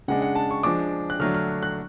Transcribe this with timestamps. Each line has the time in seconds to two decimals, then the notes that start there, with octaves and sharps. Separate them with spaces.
0.08 C#3 G#3 D4 F#5
0.22 F#5
0.35 A5
0.51 C#6
0.63 F3 G#3 D4 D6
1.10 F#6
1.20 D3 F#3 A3 D4 F6
1.34 F6
1.63 F#6